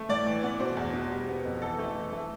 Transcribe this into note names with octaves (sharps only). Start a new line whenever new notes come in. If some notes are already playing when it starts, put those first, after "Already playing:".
Already playing: A3
A2 D5
E3
B3
B2 C5
E2
B2
G3
B3
F2
E3 A4
A3
E3
A3